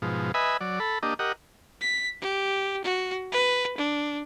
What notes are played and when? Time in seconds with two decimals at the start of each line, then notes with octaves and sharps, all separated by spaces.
0.02 G#2 B2 F3
0.34 B4 D#5 E5 G#5 B5
0.61 F#3 D5
0.80 A4 B5
1.03 A#3 D4 G4 D#5
1.19 G4 A#4 D#5 F#5
1.81 B6
2.21 G4
2.84 F#4
3.32 B4
3.77 D4